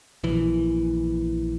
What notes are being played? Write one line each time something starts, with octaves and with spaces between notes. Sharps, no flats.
A#1 E3